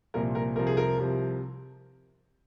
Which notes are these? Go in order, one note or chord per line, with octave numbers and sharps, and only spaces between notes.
C2 A#2 F3 A#4
A#4
C2 C3 F3 A#4
G#4
A#4
C2 C3 F3